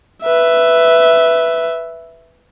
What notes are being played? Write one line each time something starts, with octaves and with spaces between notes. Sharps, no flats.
B4 E5